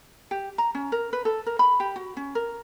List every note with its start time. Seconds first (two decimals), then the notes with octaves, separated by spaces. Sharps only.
0.31 G4
0.58 A#5
0.75 C#4
0.92 A#4
1.13 B4
1.25 A4
1.46 A#4
1.59 B5
1.80 G4
1.96 F#4
2.17 C#4
2.35 A#4